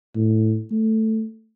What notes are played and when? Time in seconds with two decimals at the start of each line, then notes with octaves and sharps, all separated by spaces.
0.16 A2
0.72 A3